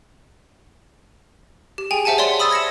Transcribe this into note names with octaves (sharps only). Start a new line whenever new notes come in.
G4
G#4 G5 G#5
C5 E5 F#5 G#5 A5
C#5 D5 E5 C6
B5 D#6 E6 A6
G#6 A#6 C#7 E7